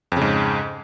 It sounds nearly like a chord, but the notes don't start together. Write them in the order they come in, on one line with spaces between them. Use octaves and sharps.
F2 C#3 G#2